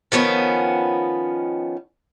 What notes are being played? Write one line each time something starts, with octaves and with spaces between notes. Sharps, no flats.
D#3 F3 B3 C#4